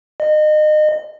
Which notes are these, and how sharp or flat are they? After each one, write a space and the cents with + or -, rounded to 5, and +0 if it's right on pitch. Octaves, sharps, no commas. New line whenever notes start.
D#5 -30